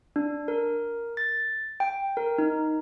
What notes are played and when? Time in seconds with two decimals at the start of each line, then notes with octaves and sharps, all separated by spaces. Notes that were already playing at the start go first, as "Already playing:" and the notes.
0.16 D4
0.48 A#4
1.17 A6
1.80 G5
2.17 A#4
2.38 D#4